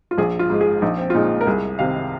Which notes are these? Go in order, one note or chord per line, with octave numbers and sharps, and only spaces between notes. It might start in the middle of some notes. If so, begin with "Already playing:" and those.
F4
A#1 G#4
F4
G#2 G#3
G#4
A#1 D#4
C4
F4
A#2 G#3 D#4
A#4
C2 G#4
C3 D#3 F5